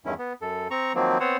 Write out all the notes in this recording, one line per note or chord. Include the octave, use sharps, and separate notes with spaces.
E2 G2 D#3 C#4 E4
B3
F#2 A4
C4 A#5 C#6
D#3 F3 F#3 A#3 C4
B3 C4 C5 C#5 F#5